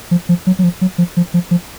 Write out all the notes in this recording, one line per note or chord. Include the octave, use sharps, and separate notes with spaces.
F3
F3
F#3
F#3
F3
F#3
F3
F3
F3
F3